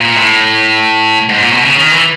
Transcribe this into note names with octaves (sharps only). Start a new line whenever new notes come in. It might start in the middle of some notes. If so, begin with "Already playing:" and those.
A#2
A2
G#2
A#2
B2
C#3
D#3
E3